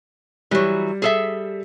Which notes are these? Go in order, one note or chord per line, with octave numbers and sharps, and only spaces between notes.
E3 F#3 G3
G#4 A4 E5